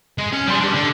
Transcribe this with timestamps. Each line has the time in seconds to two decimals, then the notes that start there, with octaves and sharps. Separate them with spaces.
0.18 G#3
0.33 C#4
0.48 G3 C6
0.60 D4 G4
0.74 D3